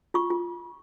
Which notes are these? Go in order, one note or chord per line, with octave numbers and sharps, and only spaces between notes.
F4 C#6
F4